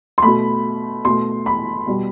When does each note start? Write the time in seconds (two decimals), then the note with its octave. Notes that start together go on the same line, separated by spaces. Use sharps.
0.18 C6
0.22 B2 A3 B5
1.05 B2 A3 C6
1.46 B5
1.87 B2 G3